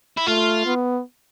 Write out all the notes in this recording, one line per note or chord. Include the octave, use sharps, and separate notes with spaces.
E4
A3 F4
B3